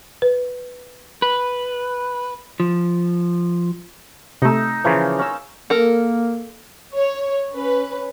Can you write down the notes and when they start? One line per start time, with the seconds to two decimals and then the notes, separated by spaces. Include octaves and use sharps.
0.22 B4
1.22 B4
2.60 F3
4.42 C3 A3 D#4 E6
4.84 C#3 E3 F3 A#3 C#5 C6
5.19 C#4 E6
5.70 A#3 A4 A#4
6.94 C#5
7.53 C#4 B4